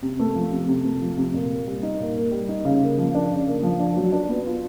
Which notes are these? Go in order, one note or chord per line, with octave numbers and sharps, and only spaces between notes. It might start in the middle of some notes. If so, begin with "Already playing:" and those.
C3
A3
F3
C3
C3
A3
F3
C3
A#2
A#3
G3
D#4
A#2
A#3
G3
D#4
C#3
A#3
F3
D4
C#3
A#3
F3
D4
F#3
D4
B3
F4